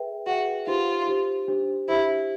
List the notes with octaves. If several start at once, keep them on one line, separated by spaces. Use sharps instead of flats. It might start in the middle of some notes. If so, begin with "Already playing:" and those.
Already playing: G#4 B4 E5 G5
F#4 G#4 B4 E5 G5
D#4 F4 G4 C5
D#4 G4 C5
D4 G4 C5
D4 E4 G4 C5